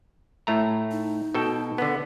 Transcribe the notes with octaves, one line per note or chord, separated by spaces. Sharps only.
A2 A3 A#5
D#4
B2 A4 G5
D3 B3 B4